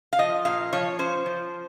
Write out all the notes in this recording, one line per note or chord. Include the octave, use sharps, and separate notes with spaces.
F5
F3 D#5
A#2 F5
F3 C#5
C#4 C5
F3